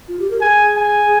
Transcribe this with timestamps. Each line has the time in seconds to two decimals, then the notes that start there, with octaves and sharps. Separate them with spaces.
0.08 F4
0.19 G4
0.31 A#4
0.41 G#4 G#5
0.77 G#5